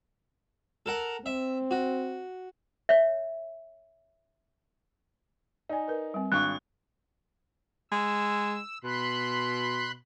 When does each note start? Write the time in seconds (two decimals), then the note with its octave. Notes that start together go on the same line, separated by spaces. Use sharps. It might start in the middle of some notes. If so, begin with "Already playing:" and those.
0.86 A4 A#4 F#5
1.26 C4 E5
1.71 F#4
2.89 C#5 E5
5.69 D#4 D5 G#5
5.88 A#4 B4
6.14 G3 C4
6.32 G#1 D4 F5 C#6 D6 F#6
7.92 G#3 E6
8.84 B2 B5 C6 F#6